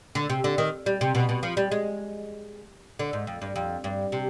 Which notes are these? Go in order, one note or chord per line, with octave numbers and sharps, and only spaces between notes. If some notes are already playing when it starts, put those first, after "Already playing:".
D3
C3
D3
D#3
G3
C3
B2
B2
F3
G3
G#3
D3
G#2
F2
G2
F2
G2
C3